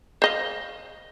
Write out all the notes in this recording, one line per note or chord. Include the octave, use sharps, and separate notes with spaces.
C5 D#5 F5